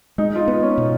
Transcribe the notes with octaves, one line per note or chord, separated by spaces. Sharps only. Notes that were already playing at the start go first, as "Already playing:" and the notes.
G#3 D#4
F4
D#4
B3
C#4
B2